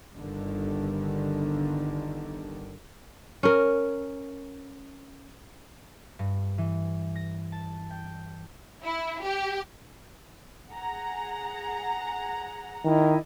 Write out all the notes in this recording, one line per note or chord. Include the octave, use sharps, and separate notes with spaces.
G1 D3 D#3
C#4 A#4
G2
E3
A#6
A5
G5
E4
G4
G#4 F#5 A#5
D#3 E4 D5 D#5